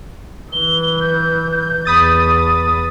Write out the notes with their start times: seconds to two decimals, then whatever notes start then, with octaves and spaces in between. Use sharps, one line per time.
0.52 E3 G7
1.01 G6
1.85 E2 B5 D#6 A6